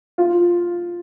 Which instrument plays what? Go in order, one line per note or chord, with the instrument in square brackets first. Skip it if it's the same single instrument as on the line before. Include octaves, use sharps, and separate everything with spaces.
[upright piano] F4